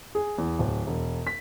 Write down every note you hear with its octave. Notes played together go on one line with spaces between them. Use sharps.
G#4
E2
D1
E1
B6